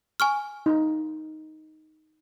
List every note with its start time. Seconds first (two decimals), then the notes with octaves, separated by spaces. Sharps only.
0.20 G#5 C#6 F6
0.66 D#4